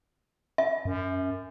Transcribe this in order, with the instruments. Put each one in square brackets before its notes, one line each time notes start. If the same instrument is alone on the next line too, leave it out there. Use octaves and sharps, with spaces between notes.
[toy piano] E5
[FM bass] F#2